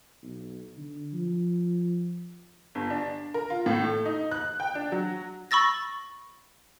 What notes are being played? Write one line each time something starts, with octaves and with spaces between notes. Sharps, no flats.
B1
D3
F3
G1
D4
A#4
F4
A2
A3
D#4
F#6
G5
D4
F#3
B5 C#6 E6 A6 A#6